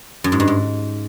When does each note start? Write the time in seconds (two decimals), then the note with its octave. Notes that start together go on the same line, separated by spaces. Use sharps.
0.24 F#2
0.32 G#2
0.40 G2
0.48 G#2